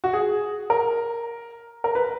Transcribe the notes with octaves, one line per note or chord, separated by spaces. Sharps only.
F#4
G#4
A#4
A#4
B4